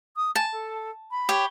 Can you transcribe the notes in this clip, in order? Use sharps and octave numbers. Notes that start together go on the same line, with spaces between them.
D#6
G#5 A5
A4
B5
G4 C#5